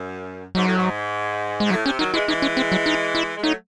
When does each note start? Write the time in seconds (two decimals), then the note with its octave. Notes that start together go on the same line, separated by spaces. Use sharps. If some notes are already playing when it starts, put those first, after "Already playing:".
Already playing: F#2
0.55 G#2 F#3
0.66 A2
0.77 G#2
1.60 G#2 G#3
1.70 A2 F#3
1.85 C3 C#4
1.99 D#3 F#3 D#4
2.13 E3 G#3 E4
2.28 E3 G#3 D#4
2.42 C#4
2.57 C4
2.72 F#3
2.86 D#4
3.15 E4
3.37 G#3
3.43 F#3 A3 D#4